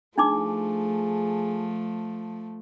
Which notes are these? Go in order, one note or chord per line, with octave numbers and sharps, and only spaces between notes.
F3 A3 D4 D#4 G#4 D6